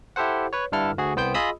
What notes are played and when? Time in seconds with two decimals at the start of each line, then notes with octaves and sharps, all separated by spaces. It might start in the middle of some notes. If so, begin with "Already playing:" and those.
0.16 E4 G4 A4 C5 F#5
0.53 B4 C#5
0.72 G2 D3 D4 E4 A4 F6
0.98 D2 F#4 G#4
1.16 C2 B3 C5 G5 G6
1.34 F4 G#4 D#5 B5 D#6 E6